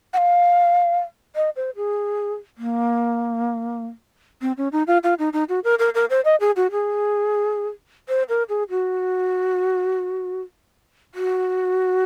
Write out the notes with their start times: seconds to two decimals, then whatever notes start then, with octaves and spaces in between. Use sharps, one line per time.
0.13 F#5
0.17 F5
1.36 D#5
1.56 C5
1.76 G#4
2.58 A#3
4.42 C4
4.57 C#4
4.72 D#4
4.87 F4
5.03 F4
5.19 D#4
5.33 D#4
5.49 F#4
5.64 A#4
5.79 A#4
5.95 A#4
6.10 C5
6.25 D#5
6.40 G#4
6.56 F#4
6.71 G#4
8.09 C5
8.29 A#4
8.49 G#4
8.70 F#4
11.15 F#4